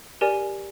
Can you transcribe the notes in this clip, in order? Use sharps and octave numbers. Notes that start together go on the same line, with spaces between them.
G4 A#4 D5 G#5